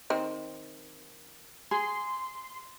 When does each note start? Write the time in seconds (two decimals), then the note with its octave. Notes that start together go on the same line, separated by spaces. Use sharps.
0.10 D#3 C4
1.71 G#4 C6